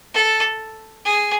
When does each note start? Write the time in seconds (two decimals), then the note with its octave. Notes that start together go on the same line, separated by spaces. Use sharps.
0.14 A4
1.05 G#4